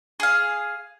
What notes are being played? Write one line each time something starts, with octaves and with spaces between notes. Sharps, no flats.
G#4 F5